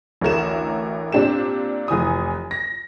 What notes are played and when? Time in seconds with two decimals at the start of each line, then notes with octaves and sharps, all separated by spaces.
0.21 A1 D2 A#4 E7
1.12 A#2 C4 D4 G4 E7
1.88 F1 E3 G#5 D#6
2.51 A#6